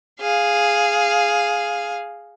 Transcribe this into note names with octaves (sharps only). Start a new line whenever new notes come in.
G#4 F5